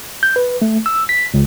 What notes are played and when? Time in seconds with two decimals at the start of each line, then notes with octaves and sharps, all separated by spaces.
0.23 G6
0.36 B4
0.62 A3
0.86 E6
1.09 B6
1.34 C#2